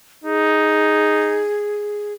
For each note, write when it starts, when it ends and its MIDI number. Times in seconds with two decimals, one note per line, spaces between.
0.24 1.48 63
0.24 2.13 68